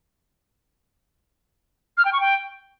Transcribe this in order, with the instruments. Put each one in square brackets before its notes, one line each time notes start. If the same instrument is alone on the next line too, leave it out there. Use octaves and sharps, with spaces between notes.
[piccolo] F6
G5
C#6
G5